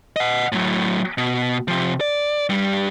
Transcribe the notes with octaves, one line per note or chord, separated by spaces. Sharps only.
D#5 F#5
A2 F#3
B2
C3 F3
D5
G2 G3